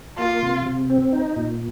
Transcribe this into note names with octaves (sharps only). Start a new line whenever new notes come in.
A#3 F4
C3
C3
C4
D#4
A#2